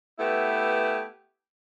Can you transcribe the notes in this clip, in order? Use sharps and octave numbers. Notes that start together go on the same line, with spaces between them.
A3 B3 E4 G4 B4